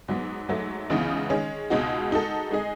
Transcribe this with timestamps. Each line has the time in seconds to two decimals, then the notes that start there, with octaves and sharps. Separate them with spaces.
0.08 G#2 F#3 B3
0.49 G#2 F#3 A3
0.90 C#2 C#3 E3 B3 D#4
1.30 D#3 G#3 C#4
1.70 C#2 B2 G#3 D#4 F#4
2.11 G#3 D#4 F#4 A4
2.51 G#3 D#4 G#4 D#5